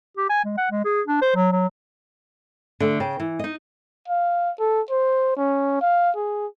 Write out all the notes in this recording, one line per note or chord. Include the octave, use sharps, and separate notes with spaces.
G4
G#5
G#3
F#5
G#3
G#4
D4
C5
F#3
F#3
D3 A3
C#3 G5
E3
D#4 D#5
F5
A4
C5
C#4
F5
G#4